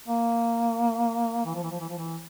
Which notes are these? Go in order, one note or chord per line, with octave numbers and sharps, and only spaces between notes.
A#3
E3
F3
E3
F3
E3
F3
E3